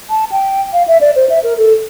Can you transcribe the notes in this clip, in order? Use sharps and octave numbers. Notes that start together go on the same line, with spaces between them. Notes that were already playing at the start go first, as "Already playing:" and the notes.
A5
G5
F5
E5
D5
C5
E5
A#4
A4